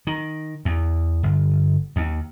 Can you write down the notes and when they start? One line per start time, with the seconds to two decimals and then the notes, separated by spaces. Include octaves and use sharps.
0.07 D#3
0.65 E2
1.23 G1
1.96 D#2